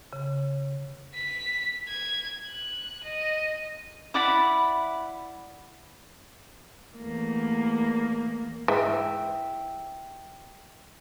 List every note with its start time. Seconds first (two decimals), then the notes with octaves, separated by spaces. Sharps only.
0.13 C#3
1.14 B6
1.88 G#6
2.46 F#6
3.03 D#5
4.14 E4 D5 F#5 B5
6.97 E2 A3 A#3
8.68 G#2 E3 E5 G5 E6